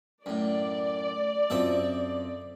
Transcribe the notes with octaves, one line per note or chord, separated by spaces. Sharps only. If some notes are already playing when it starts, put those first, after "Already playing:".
F#2 A2 D5
F#2 C4 F4 A4 D#5 E5